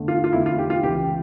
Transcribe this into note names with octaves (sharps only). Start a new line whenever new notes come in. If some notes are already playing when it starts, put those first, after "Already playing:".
Already playing: E2 D3 A3
F4
F4
E2 D3 A3 E4
F4
G4
F4
C#2 C#3 E3 G4